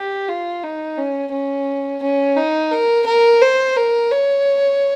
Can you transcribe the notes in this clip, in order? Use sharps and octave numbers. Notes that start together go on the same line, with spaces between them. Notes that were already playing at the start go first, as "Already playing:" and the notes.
Already playing: G4
F4
D#4
C#4
C#4
C#4
D#4
A#4
A#4
C5
A#4
C#5